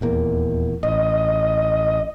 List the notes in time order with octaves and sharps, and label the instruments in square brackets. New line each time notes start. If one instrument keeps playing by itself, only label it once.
[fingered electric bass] D#1 E2 A#3
[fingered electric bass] A1 [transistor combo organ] D#5